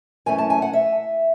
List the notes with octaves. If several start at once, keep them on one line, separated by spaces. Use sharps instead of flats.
F#2 E3 A3 C#4 G#5
A5
G#5
F#5
E5